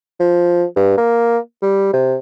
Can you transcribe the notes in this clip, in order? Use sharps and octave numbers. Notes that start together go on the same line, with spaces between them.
F3
G2
A#3
G3
C3